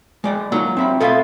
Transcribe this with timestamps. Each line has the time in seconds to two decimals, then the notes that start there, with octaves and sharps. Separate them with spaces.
0.24 G#3 D5 F#5
0.52 F#3 A#3 D#4 F4
0.77 C4 E5 B5
1.01 B2 G#3 F4 A4 E5